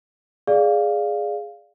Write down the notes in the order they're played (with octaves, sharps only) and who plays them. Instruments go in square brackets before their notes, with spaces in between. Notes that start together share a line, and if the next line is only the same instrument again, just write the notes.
[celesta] G#4 D5 F5